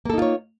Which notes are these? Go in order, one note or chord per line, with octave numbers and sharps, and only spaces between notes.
A#3 D#4 F4 A4 C#5